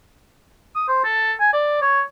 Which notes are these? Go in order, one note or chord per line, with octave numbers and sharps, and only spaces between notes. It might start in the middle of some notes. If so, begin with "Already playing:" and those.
D#6
C5
A4
G#5
D5
C#5